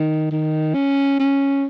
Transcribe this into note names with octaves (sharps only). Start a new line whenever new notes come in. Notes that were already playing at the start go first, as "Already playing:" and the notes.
Already playing: D#3
D#3
C#4
C#4